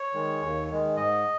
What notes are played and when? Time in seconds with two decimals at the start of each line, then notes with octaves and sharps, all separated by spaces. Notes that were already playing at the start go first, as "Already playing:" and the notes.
Already playing: C#5
0.14 D#3 G#3
0.42 D#2
0.69 D#3 G#3
0.96 G#2 D#5